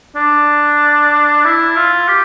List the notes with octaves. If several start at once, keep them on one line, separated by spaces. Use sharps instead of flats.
D4
E4
F4
G4